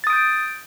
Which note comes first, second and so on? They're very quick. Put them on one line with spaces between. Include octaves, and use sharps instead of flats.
A6 D#6 D7 G6